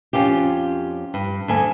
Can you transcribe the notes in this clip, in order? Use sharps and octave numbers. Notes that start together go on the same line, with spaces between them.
F2 C#4 F4 G4
G2
D2 G2 A4 G#5